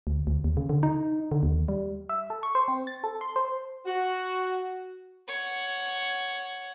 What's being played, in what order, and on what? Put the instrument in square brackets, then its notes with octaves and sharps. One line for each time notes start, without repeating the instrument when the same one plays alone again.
[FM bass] D2
D2
D#2
C#3
D3
D#4
D3
D#2
G3
[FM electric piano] E5
A4
C#6
C5
C4
A6
A4
C6
C5
[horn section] F#4
[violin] C#5 F#5